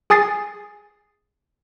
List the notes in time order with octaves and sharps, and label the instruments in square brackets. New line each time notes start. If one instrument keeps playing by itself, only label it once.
[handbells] G#4 G#5 D#6 A6 C7